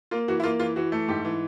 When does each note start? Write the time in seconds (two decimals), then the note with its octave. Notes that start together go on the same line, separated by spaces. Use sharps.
0.11 A#3 F4
0.28 E3 F#4
0.40 E4
0.43 A#3 F4
0.60 E3 F4
0.76 E3 F#4
0.92 A3
1.08 G#2 G4
1.25 E3